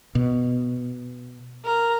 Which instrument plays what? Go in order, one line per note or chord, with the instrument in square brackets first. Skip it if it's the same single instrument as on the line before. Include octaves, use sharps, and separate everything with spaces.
[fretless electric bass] B2
[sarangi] A#4